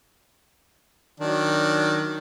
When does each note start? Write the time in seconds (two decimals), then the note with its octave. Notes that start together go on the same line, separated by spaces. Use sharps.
1.20 D#3 F#3 D4